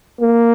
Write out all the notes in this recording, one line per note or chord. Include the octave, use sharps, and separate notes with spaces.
A#3